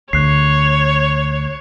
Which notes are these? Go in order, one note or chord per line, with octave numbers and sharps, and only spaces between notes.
D2 C#5 F#6 C7